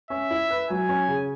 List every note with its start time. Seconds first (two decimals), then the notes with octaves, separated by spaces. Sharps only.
0.10 C#4 E5
0.31 E4
0.50 B4
0.70 F#3 G#5
0.89 C#4
1.08 C#3